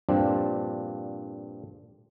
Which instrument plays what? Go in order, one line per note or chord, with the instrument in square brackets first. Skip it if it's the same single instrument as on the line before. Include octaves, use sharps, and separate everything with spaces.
[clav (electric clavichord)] G2 A#2 F3 C4 D4